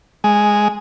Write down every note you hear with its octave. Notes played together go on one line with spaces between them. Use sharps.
G#3